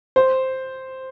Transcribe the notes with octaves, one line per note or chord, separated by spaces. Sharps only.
C5